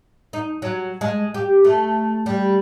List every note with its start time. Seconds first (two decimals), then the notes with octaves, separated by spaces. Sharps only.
0.33 D#4
0.62 F#3
1.01 G#3
1.34 G4
1.64 A3
2.26 G3